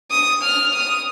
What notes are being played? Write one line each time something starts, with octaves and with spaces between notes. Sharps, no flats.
D#6
F6
D#6